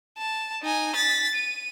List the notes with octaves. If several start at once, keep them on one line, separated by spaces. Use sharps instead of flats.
A5
D#4 G#5
A6 B6
D#7